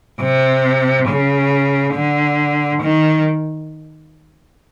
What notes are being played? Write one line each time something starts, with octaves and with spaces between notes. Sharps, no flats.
C3
C#3
D3
D#3